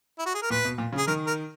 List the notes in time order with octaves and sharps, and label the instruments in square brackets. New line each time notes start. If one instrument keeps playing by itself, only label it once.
[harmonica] E4
F#4
G#4
A#4
[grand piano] A#2 [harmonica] B4
[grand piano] B2
A#2
C#3
[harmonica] G#4
[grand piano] D#3 [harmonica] A#4
[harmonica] A#4